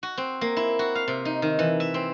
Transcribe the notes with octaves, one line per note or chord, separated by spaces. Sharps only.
F#4
C4
A#3
E4
F#4
F5
C3
D#4
D#3
E3
E5
C4